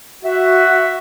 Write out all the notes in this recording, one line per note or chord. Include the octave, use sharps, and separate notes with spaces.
F#4 E5